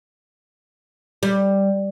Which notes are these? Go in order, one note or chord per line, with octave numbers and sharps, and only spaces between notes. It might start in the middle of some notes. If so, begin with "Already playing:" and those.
G3